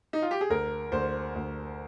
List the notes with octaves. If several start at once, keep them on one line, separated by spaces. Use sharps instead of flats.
D#4
F4
G4
G#4
D2 A#4
D2 C5
D2